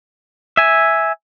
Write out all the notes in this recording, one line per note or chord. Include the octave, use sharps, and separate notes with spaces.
E5 G#5